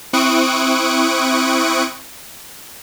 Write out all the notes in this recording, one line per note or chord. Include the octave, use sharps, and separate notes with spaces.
C4 E4 C#6 D#6 F#6 D7